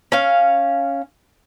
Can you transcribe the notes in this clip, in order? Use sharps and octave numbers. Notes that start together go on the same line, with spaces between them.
C#4 F5